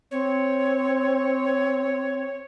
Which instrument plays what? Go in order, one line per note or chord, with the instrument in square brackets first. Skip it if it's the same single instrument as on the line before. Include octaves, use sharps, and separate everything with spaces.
[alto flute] C4 [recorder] C#5